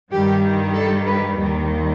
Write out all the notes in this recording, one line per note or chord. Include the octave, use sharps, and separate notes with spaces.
G2 D#3 G3 G4
A4
B4
D#2 D#3 G3